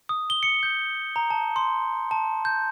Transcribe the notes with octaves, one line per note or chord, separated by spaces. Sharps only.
D#6
G7
C#7
G6
A#5
A5
C6
A5
G6